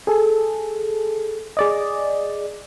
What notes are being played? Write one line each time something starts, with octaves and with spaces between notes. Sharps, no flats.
G#4 A4
G#4 D5 D#5